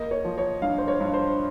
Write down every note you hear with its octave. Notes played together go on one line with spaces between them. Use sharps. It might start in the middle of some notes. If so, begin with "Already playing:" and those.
Already playing: A#3 D#5
C#5
F3
C#5
G2 F5
C5
C#5
G2
C5